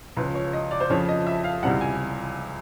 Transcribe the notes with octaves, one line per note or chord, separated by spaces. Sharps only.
C#2 C#3 F3 B4
C#5
D#5
D5
C5
F2 C#3 F3 C#5
D#5
E5
F5
C#2 C3 E3 G3 F#5
G#5